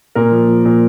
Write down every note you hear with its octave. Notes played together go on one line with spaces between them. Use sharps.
A#2 A#4
F3
F3
A#2